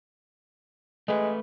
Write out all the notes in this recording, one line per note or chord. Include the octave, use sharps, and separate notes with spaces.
G#3 A3 B4